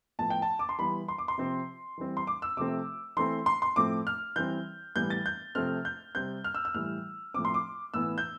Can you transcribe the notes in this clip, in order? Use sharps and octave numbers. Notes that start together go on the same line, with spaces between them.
A2 F3 B3 A5
G5
A5
D6
C6
E3 G3 B3 B5
C6
D6
C6
C3 F3 C4
E3 G3 C4
C6
D6
E6
C3 F3 A3 C4 D6
E3 A3 C4 C6
C6
C6
A2 F3 A3 C4 D6
F6
E3 G3 C4 G6
A2 E3 G3 B3 G6
A6
G6
C3 F3 A3 C4 F6
G6
C3 G3 C4 G6
F6
E6
E6
A2 E3 G3 F6
A2 F3 C4 D6
C6
D6
A2 E3 B3 E6
G6